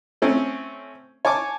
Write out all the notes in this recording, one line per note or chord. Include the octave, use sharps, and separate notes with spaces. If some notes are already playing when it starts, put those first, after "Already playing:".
A3 C4 C#4
C#5 G#5 A5 D6